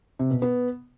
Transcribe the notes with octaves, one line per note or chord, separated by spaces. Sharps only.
C3
B2
B3